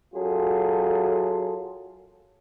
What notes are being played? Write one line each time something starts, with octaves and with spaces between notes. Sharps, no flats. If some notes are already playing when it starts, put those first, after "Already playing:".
F#2 F#3 F4 G#4 A4